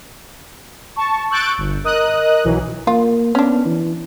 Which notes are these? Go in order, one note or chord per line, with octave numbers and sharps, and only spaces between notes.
A5 C#6
C#6 E6 F#6 G6 A6 D7
G1
A#4 D#5 D#6 F#6
B1 E3 F#3
A#3 F4
B3 C#4 D4
E3